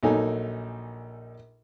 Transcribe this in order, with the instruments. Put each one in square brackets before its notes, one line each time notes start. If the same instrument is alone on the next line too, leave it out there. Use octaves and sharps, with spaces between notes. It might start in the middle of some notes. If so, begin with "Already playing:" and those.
[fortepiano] A#1 F#3 D#4 A4 G#5